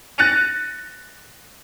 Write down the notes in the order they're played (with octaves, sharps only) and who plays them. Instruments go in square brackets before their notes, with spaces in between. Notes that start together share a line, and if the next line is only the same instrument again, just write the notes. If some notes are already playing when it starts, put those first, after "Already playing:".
[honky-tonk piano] F#6 A6 A#6 C#7 D#7 F7